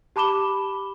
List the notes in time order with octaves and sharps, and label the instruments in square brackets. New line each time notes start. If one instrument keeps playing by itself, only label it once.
[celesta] G4 A5 B5 D6 E7 G7